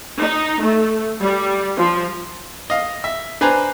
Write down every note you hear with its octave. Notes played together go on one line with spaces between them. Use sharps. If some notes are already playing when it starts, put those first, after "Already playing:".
D#4
A3
G3
F3
D#5 F5
E5
D4 B4 C5 G#5 A#5